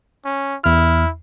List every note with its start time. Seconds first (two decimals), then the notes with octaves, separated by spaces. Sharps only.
0.25 C#4
0.64 E2 E4 F6